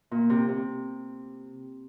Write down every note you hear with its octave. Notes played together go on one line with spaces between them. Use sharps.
A#2
C3
C3